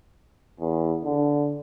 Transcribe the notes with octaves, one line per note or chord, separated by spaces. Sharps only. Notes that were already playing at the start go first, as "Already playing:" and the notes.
E2
D3